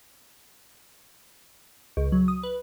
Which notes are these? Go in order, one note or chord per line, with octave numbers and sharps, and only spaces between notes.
C#2
F#3
D#6
B4